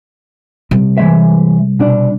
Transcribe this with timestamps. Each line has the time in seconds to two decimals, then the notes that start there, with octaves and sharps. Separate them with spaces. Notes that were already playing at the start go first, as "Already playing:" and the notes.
0.71 C3 G3
0.98 E3 G#3 E5
1.79 B2 D4